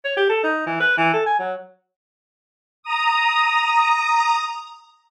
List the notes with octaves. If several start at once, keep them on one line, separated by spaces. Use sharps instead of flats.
C#5
G4
A4
D#4
E3
B4
E3
A4
G#5
F#3
A#5 D#6